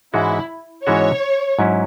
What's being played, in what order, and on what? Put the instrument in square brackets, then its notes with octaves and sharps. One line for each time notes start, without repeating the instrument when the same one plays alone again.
[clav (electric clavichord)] G#2 E3 G#3 C#4 F#4 [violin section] E4
[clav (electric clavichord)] G#2 E3 G#3 C#4 F#4 [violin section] C#5
[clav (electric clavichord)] G#2 F#3 C#4 E4